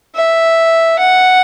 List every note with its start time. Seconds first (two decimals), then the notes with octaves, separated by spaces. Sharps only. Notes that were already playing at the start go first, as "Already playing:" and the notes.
0.15 E5
0.99 F#5